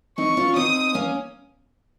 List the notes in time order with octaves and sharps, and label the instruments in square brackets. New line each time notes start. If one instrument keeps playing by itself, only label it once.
[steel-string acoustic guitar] C4 D#4 [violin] C#6
[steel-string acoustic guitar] C#4 F4
[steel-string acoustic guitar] C4 D#4 [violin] D#6
[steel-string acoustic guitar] A#3 C#4